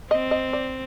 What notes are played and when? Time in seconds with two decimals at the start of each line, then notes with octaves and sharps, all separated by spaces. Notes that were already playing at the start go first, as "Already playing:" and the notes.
0.11 C4 D#5
0.31 D#5
0.53 D5